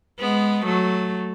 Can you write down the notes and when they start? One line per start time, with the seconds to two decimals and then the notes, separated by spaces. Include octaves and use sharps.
0.20 G#3 B3
0.65 F#3 A3